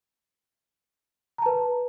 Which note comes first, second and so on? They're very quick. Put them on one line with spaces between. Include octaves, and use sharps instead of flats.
A#5 A5 B4